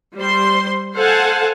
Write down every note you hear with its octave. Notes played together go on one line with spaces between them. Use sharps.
G3 C5 C6
A4 C5 F5 F#5 G#5 A5